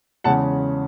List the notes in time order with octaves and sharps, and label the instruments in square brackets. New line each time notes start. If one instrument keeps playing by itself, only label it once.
[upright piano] E2 C#3 G#3 C#4 F#5 A5